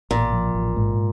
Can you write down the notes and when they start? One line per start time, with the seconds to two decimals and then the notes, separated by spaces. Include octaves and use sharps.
0.11 A1 A#2
0.33 F3
0.55 A1
0.76 G#2